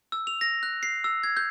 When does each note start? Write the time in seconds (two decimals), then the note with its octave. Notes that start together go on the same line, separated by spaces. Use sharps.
0.12 E6
0.27 F7
0.41 A#6
0.63 F#6
0.83 C7
1.04 E6
1.24 G#6
1.37 G6